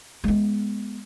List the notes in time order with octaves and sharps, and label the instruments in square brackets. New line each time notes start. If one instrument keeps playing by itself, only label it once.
[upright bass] G#3 B3